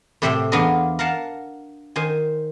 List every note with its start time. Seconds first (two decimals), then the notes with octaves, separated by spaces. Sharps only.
0.22 A2 C3 A3 C4 E5 G5
0.52 E2 B3 D4 F4 A#4 D#5
0.99 A#4 F5 F#5 A5
1.96 D#3 C5 G#5